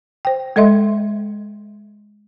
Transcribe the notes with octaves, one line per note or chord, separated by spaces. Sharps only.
C5 G5
G#3 A4 D#5 E5 C6